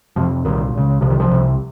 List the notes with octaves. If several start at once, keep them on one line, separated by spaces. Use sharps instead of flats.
F2 C3 F3
C2 A#2 D#3
C#2 C#3
C2 C3 F3
D#3
F3
C2 C3